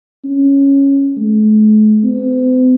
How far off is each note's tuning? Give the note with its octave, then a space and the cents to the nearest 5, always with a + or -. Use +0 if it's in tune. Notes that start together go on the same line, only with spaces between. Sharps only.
C#4 -5
A3 -45
C4 -45